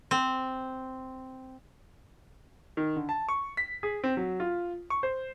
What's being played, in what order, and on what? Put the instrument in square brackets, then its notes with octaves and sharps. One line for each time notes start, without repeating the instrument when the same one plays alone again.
[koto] C4
[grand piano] D#3
D3
A5
C#6
B6
G#4
C4
F#3
F4
C#6
C5